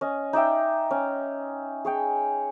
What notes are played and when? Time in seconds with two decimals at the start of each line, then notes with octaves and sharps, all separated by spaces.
0.01 C#4 D#5
0.33 D#4 D5 E5 G5
0.91 C#4
1.85 G#4 C#5 G5